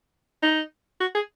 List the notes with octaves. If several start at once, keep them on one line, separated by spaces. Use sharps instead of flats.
D#4
F#4
G#4